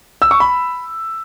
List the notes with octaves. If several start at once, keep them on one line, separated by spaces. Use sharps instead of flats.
E6
C#6
B5